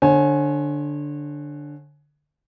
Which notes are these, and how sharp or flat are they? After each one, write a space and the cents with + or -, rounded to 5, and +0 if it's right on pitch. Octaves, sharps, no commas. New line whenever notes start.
D3 +0 C#5 -35 G#5 +15